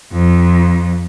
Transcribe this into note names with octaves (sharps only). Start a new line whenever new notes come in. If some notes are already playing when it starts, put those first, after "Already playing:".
F2